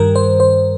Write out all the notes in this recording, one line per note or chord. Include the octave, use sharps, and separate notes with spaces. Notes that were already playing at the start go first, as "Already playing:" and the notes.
Already playing: G2 D#3 G3 A#4
C5
C5